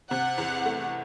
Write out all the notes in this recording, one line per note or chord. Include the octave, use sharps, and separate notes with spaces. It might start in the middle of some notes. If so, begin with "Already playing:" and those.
C3 F#5
E2
A3